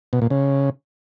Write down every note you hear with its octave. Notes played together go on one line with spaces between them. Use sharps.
B2
A#2
C#3